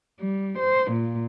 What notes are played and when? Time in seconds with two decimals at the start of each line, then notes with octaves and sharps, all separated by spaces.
0.20 G3
0.59 C5
0.92 A#2